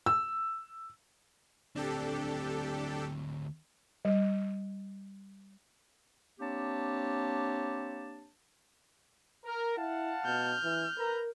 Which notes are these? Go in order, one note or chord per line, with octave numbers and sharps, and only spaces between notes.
E6
D2 C4 D4 G4 A4
G3
A#3 C4 D4 G4 C#5 A5
A#4
E4 F5 F#5 A5
B2 F6 G6
E3
A#4 B4 A#5